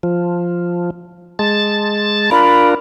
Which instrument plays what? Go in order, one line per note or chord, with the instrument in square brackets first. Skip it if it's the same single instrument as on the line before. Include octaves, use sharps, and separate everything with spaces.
[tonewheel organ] F3
G#3 A5 A6
[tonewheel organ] D4 F4 A#4 [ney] B5